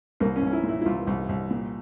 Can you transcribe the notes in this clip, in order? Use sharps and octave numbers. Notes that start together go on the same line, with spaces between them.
C2 A#3
C#4
C2
C#4
E4
A#2
E4
E4
C2 F4
C2
C2
A#2